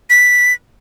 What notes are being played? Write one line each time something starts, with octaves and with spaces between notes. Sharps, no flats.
B6